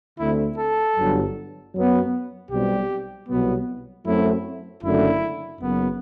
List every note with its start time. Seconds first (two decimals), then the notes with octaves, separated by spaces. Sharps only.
0.19 D2 D3 A3 C4 E4
0.58 A4
0.97 G1 G2 F#3
1.74 F#2 F#3 B3
2.52 B1 B2 G3 C4 G4
3.29 C2 B2 F#3 B3
4.06 F#2 F#3 A3 C4 E4
4.84 F#1 F#2 D3 A3 E4
5.61 F#1 F#2 F#3 B3